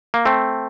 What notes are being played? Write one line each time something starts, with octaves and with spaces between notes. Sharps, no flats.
A#3
A3 C4